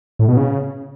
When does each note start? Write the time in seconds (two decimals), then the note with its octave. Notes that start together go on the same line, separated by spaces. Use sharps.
0.19 A2
0.28 B2
0.37 C#3